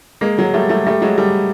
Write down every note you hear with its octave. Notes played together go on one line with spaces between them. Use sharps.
G#3 A#3
F#3 G#3
G3 A3
G3 A3
G3 A3
F#3 G#3
G3 A3